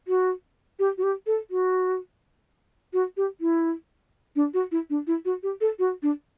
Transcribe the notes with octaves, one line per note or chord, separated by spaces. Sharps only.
F#4
G4
F#4
G4
A4
F#4
F#4
G4
E4
D4
F#4
E4
D4
E4
F#4
G4
A4
F#4
D4